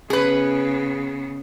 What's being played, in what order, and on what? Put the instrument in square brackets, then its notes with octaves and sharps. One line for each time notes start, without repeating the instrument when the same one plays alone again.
[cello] C#3 B3 [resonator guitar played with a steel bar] G#4 B4